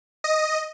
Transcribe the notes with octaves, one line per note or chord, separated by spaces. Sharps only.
D#5